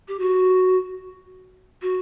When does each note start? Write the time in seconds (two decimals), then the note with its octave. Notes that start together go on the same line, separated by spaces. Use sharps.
0.08 G4
0.20 F#4
1.82 F#4